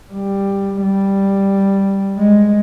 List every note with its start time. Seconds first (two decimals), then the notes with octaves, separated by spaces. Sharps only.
0.13 G3
0.82 G3
2.18 G#3